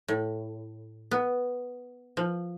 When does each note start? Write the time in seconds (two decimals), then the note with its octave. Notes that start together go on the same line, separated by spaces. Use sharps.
0.08 A2
1.11 B3
2.17 F3